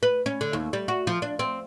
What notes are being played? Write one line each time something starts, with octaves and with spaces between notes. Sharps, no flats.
B4
C#4
D3
D#2
G3
F#4
F3
D4
C4